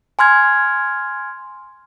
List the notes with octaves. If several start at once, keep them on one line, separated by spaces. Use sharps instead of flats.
G#5 C6 F6 G#6